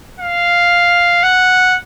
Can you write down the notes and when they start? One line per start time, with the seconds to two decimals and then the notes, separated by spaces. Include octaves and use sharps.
0.20 F5
1.23 F#5